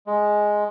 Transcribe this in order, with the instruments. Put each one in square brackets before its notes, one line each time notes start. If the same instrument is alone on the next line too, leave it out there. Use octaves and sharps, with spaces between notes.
[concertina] G#3